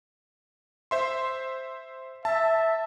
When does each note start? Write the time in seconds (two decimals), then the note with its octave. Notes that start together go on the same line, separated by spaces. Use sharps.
0.91 C5 E5 C6
2.25 E5 A5